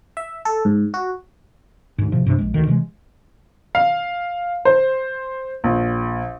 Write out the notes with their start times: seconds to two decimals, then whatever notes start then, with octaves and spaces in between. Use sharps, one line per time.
0.17 E5
0.45 A4
0.65 G#2
0.94 F#4
1.98 D2 G#2
2.12 A2 C3 F3
2.25 B1 G2 C3
2.38 A#1 G#3
2.54 D2 D#3
2.67 C3 E3 F3 G#3
3.75 F5
4.65 C5
5.64 A#1